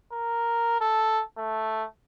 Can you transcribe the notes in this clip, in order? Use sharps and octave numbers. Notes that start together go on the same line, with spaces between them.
A#4
A4
A3